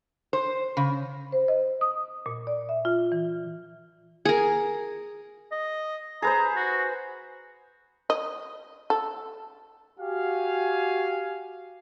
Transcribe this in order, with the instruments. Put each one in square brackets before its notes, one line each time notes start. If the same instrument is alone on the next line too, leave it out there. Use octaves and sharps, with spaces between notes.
[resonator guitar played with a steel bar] C5
C#3
[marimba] C5
D#5
D#6
A#2
D5
E5
F4
E3
[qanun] G#4 A#4
[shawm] D#5
[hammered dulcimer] G#4 B4 C5 [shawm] A#5
[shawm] F#4
[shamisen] D#5
A4
[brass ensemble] F#4 G4 F5 G#5